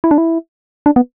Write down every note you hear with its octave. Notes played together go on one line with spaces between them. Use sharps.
E4
D4
E4
D4
B3